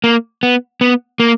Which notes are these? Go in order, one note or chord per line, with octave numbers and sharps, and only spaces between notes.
A#3
B3
B3
A#3